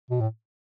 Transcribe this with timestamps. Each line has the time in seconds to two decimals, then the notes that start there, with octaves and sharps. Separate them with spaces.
0.11 B2
0.21 A2